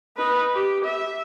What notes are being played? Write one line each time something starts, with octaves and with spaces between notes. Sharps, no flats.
D#4 B4
G4
E5